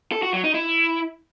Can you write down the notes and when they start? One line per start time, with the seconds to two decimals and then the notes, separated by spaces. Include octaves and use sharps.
0.12 A4
0.23 F#4
0.33 F#3
0.44 D#4
0.54 E4